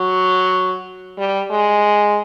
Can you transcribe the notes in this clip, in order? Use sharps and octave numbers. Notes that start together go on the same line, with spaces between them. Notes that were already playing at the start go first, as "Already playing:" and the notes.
Already playing: F#3
G3
G#3